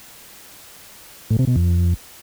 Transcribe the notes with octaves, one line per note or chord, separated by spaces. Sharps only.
A2
C3
B2
F2